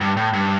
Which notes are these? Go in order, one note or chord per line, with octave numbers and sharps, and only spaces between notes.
G2
A2
G2